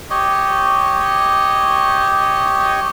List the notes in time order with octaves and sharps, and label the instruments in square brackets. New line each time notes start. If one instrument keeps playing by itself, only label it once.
[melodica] G4 C#5 D#5